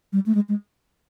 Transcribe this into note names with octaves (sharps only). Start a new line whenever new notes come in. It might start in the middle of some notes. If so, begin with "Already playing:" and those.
G3
A3
G#3
G#3